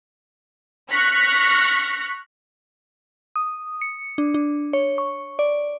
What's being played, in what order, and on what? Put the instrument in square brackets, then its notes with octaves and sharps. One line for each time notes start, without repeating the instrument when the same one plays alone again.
[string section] C#6 F6 F#6 A#6 B6
[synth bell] D#6
C#7
D4
D4
C#5
C#6
D5